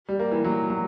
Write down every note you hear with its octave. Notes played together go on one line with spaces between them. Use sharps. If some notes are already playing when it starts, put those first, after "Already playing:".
G3
A#3
E3
F#3
F#3